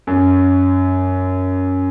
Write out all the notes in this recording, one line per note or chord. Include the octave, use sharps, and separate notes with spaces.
F#2